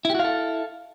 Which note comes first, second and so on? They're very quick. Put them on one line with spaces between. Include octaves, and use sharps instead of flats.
E4 G4 F#4 F5 A4